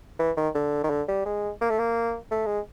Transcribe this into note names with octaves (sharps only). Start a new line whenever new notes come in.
E3
D#3
D3
D#3
D3
G3
G#3
A#3
A3
A#3
A3
G#3